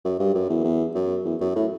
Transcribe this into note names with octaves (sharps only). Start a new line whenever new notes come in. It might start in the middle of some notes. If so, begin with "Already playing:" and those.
F#2
G2
F#2
E2
E2
F#2
E2
F#2
A2